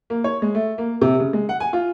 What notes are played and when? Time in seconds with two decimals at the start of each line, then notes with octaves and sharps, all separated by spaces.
0.10 A#3
0.24 C#5
0.42 G#3
0.55 A3
0.78 A#3
1.02 C3
1.19 C#3
1.33 G#3
1.49 F#5
1.60 G#5
1.73 F4